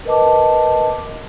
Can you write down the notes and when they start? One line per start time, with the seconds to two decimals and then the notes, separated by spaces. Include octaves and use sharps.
0.05 A#4 B4 D#5 A5 D6